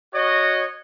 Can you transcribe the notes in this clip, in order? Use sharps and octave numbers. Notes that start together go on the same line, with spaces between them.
F#4 C#5 D#5